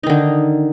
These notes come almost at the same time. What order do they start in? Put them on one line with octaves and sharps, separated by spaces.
D#4 D#3 D3